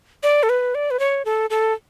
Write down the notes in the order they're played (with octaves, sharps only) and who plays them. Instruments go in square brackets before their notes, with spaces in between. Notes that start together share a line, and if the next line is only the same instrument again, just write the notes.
[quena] D5
A4
B4
D5
B4
C#5
A4
A4